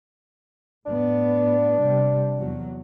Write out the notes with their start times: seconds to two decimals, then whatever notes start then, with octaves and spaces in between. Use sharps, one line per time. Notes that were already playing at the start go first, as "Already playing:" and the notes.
0.86 A2 B3 D4
1.80 C3 G3
2.36 E2 F#3